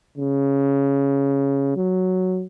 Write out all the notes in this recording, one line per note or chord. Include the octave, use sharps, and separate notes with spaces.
C#3
F#3